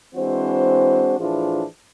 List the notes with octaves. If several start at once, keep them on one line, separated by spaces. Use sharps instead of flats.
E3 G#3 C4 D4 F#4 C5
A2 E3 F3 D4 F4 G#4